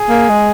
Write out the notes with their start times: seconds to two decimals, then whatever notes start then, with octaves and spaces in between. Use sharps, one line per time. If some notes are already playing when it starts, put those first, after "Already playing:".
Already playing: G#4
0.10 A#3
0.29 G#3